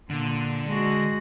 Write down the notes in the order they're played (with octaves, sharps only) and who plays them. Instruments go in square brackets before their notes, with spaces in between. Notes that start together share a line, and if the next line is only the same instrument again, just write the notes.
[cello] A#2 [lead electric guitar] D3
[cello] G#3 F#4